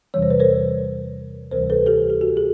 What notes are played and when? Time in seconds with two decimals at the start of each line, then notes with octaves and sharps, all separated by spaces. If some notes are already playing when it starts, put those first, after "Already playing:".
0.14 E2 C3 E3 G3 C#5
0.23 C5
0.31 B4
0.40 A#4 C5
1.51 D2 C3 E3 G3 A#4 C5
1.70 A4 B4
1.86 G4 A4
2.10 G4
2.21 F#4 G#4
2.37 G#4